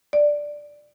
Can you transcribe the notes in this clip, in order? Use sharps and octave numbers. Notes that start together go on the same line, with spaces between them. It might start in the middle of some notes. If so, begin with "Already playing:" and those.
D5